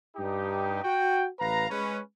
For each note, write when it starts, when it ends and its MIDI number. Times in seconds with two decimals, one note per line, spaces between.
0.17 0.82 43
0.17 0.82 63
0.17 0.82 67
0.83 1.27 66
0.83 1.27 79
1.40 1.68 33
1.40 1.68 71
1.40 1.68 77
1.40 1.68 82
1.71 2.00 56
1.71 2.00 61
1.71 2.00 71